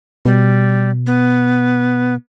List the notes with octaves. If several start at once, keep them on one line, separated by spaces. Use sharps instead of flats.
B2 G3
B3